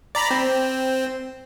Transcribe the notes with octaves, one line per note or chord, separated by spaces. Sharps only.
D5 A#5 B5
C4